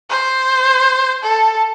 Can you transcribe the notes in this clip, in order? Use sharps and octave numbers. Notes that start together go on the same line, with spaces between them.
C5
A4